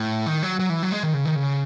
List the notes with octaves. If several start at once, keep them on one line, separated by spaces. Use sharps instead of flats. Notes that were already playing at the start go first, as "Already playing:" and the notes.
Already playing: A2
D#3
F#3
F#3
E3
F#3
G#3
D#3
C#3
D#3
C#3